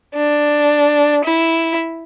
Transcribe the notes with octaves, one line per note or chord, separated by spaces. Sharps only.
D4
E4